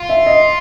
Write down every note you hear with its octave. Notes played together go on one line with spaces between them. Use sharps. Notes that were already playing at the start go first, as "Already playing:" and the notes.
Already playing: F4
E5
D#5